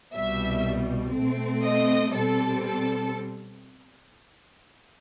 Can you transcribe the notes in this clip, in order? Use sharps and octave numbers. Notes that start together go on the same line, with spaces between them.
C2 B2 G3 E5
B2 A3 C4
D#5
B2 G3 C4 A4
A4